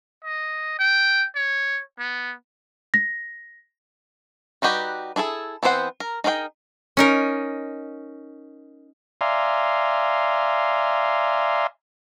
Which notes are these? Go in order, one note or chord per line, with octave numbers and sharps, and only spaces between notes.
D#5
G5
C#5
B3
A#6
G3 D#4 F#4 G4 B4
D4 E4 G#4 A4
E3 B3 C4 C5 F#5
A#4
D#4 G#4 A#4 D5 G5
C#4 D#4 A#4
D5 E5 F5 G#5 A#5 C6